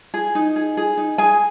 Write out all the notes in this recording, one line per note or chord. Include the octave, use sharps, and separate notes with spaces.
G#4
D#4
G#4
G#4
D#4
G#4 G#5